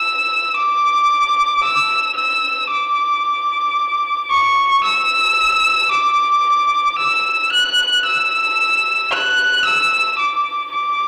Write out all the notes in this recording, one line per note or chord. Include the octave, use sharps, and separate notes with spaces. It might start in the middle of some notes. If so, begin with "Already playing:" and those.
Already playing: E6
D6
E6
E6
D6
C#6
E6
D6
E6
F#6
E6
F#6
E6
D6
D6